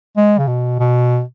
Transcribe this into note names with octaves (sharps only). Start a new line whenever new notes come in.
G#3
C#3
B2
B2